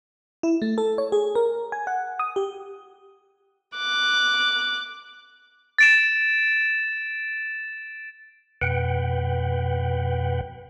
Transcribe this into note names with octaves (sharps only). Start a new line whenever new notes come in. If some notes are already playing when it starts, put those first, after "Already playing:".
E4
A3
A4
C#5
G#4
A#4
G#5
F#5
D#6
G4
D6 F#6
A6 D7 E7
F2 B2 B4 F#5 G5